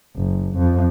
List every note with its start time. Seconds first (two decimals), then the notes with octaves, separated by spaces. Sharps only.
0.16 F#1
0.57 F2